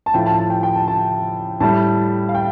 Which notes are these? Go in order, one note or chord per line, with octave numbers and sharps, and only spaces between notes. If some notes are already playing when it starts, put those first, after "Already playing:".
A5
A2 F3 G5
A5
A5
G5
G5
A5
A5
A2 G3 A5
F5
G5